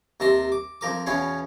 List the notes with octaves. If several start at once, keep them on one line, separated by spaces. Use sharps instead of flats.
D#2 C3 A5 A#5 C6
D6
F2 F3 A#4 D6
E2 B2 C#4 C#5 F5